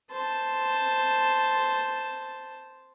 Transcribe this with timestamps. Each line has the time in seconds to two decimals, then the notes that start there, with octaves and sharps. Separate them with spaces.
0.11 C5 A5